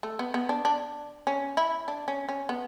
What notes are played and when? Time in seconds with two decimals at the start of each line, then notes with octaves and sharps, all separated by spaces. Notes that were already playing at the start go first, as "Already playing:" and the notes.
0.03 A3
0.19 B3
0.34 B3
0.49 D4
0.65 D4
1.27 C#4
1.57 E4
1.88 D4
2.08 C#4
2.29 C#4
2.49 B3